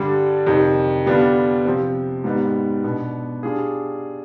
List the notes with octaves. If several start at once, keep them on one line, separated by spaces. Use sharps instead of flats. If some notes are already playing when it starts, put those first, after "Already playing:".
Already playing: G2 D3 G3 D4
F2 C3 D#3
D3 G3 B3 D4 F4
C3 F3 C4
G#2 G3 B3 D#4
B2 B3 D4
G3 D4 F4 G#4